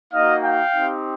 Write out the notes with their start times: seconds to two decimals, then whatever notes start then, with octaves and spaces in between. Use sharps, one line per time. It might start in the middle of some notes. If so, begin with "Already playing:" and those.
0.12 A#3 D#4 F#4 D#5 F5
0.43 F5 G5
0.74 C4 D#4 G4